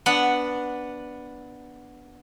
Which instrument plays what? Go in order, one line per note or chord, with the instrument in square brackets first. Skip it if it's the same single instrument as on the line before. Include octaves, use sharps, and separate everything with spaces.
[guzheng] B3 D4 F#5